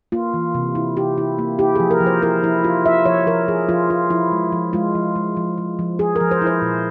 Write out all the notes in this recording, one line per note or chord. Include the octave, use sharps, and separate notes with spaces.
A#3 F4
E3
C3
E4
E4 G4
E4
A#3
E4 G4
F3 G#4
A#4
F3
C5
E4 A#4
F3 E4
F3 F4
E4 E5
F3 C#5
F3 A#4
F3 G#4
F3 F4
F3 F4
F3 E4
G#3
F3
G#3 F4
F3
G#3
F3
F3
F3
F3 G#4
F3 A#4
C5
E4
C5
A#2